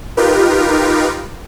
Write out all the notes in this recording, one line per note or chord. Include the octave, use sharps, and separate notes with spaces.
D#4 F4 G4 A#4 B4